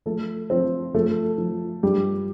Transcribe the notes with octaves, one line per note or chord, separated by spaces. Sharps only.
F3 A3 A4
F3 C4 C5
F3 A3 A4
F3
G2 G3 G4